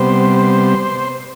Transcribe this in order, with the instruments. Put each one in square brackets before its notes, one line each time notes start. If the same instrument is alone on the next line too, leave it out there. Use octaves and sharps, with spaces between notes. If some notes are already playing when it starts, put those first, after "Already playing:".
Already playing: [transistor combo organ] C3 G3 B3 C5